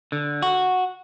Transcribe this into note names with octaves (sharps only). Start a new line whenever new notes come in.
D3
F#4